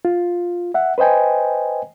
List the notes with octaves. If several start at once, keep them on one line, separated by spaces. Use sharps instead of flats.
F4
E5 F#5
B4 C5 D#5 G5 G#5